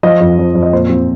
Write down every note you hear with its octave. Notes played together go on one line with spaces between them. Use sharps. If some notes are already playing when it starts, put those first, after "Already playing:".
F3 D#5
F2
F2
F2
D#5
A#2 C5
F3 C4